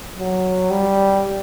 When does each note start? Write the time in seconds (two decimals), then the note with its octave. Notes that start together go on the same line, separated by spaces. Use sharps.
0.19 F#3
0.71 G3